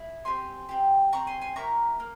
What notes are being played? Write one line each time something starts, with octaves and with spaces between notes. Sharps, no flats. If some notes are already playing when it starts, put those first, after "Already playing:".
Already playing: E4 G#4
C4 G4 G#5 C6
C4 G4
C4 G4 A#5 C#6
G#5 C6
G#5 C6
A#3 E4 G4 A#5 C#6
A#3